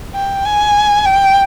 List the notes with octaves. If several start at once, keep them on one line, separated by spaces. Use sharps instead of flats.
G5
G#5
G5